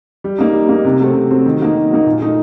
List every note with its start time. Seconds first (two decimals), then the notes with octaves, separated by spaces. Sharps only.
0.24 G3
0.38 A#3 D#4
0.54 G3
0.69 A#3 D#4
0.84 C3
1.00 F#3 A3 C4
1.15 C3
1.31 F#3 A3 C4
1.46 D#3
1.60 F#3 A#3 D#4
1.75 D#3
1.90 F#3 A#3 D#4
2.06 A#2
2.21 A3 D#4